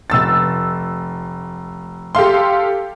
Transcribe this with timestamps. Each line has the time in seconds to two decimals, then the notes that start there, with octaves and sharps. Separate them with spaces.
0.10 F1 E6 A6
2.15 G4 A4 F5 C6